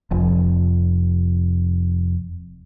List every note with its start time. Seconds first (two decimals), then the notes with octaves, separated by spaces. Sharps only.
0.11 F1 F2